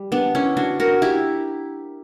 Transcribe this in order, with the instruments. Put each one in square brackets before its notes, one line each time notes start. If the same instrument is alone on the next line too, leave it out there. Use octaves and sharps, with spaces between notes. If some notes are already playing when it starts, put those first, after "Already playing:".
Already playing: [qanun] G3
B3 D4
C#4 E4
D4 F#4
F#4 A#4
E4 G4